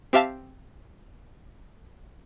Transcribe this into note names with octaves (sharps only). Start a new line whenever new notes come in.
C4 G4 E5 F5 A5